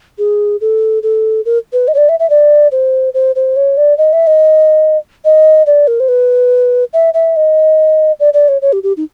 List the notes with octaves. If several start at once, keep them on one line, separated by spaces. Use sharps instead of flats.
G#4
A4
A4
A#4
B4
D#5
C#5
D5
E5
E5
D5
C5
C5
C5
C#5
D5
D#5
E5
D#5
D#5
D5
A#4
C5
B4
E5
E5
D#5
D5
D5
C#5
C#5
G4
G4
D#4